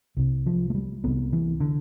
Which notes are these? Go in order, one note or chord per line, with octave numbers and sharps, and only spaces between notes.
C2 C3
F3
A3
G3
C2 C3 B3
E3
D3